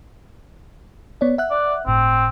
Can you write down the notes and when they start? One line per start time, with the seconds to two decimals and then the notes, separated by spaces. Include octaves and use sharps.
1.21 B3 C#5 D5
1.38 E5 F#5 F#6
1.50 D5
1.86 G1 A2 C4